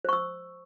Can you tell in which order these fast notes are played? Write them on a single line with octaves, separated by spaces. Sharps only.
C5 C#6 E6